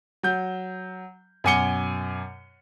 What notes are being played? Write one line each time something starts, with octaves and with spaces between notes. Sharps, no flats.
F#3 G6
F#2 B2 G#5 D6 C#7 G7